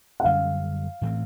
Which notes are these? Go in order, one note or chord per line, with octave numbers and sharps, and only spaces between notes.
F#5
F#2 D3 G3 F5
A2 E3 A3 C4